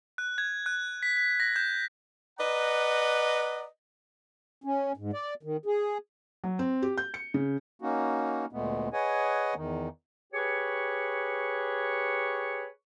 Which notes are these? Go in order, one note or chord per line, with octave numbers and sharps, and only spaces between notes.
F#6
G#6
F#6
B6
B6
A#6
G6
B4 D5 D#5 F#5 A#5
C#4
G#2
D5
D#3
G#4
F#3
C4
G4
G6
C#7
C#3
A#3 C#4 D#4 F#4
D2 A#2 G#3 A3 B3
G#4 B4 C#5 D#5 F#5 G#5
E2 D#3
G4 G#4 B4 C#5 C#6